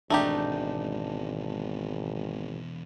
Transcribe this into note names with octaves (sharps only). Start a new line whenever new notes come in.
G#1 E2 B2 A3 D4 D#4 G4